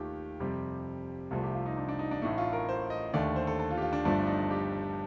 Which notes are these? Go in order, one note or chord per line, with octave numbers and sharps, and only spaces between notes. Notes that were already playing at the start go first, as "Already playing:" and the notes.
Already playing: D#2 D#3 A3 F4 G4
F2 C3 G3 G4
C2 C3 F3 A3 A4
G4
F4
D#4
D4
D4
D#4
D4
A1 A2 A3 D#4
F4
A#4
C5
D#5
D#2 D3 A3 D5
C5
A4
A4
F4
G4
F4
D4
G1 G2 F3 A3 D4
D#4
G4